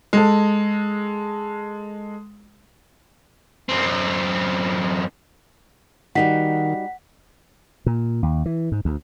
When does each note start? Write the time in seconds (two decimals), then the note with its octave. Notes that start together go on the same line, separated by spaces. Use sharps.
0.13 G#3 A4
3.69 F#2 C4
6.15 D#3 G3 D#4 F#4 F#5 B6
7.86 A#2
8.23 D#2
8.46 E3
8.72 G#2
8.85 D2